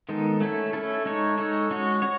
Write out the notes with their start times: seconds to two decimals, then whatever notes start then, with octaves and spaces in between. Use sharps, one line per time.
0.09 D#3 G#3 B3 D#4 A4
0.40 A3 C#4 E4 A4
0.73 A3 C#4 E4 A4
1.05 G#3 D#4 A4 C#5
1.38 G#3 D#4 A4 C#5
1.70 G#3 C#4 F#4 C#5
2.02 F#4 C#5